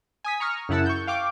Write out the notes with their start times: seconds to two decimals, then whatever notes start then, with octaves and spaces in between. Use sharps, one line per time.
0.24 G#5 D#6 B6
0.40 A#5 C#6 D#6 F6
0.69 F#2 C#3 E4 F#5 A5 E6
0.86 C#6 G6
1.07 F5 G5 C#6 D6